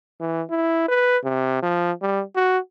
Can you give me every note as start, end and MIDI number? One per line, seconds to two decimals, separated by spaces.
0.20 0.42 52
0.50 0.88 64
0.88 1.17 71
1.24 1.62 48
1.62 1.92 53
2.02 2.22 55
2.36 2.58 66